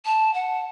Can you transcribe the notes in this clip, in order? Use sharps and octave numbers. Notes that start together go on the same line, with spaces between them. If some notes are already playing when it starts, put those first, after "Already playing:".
A5
F#5